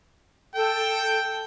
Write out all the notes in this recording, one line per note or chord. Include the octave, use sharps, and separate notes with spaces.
A4 G5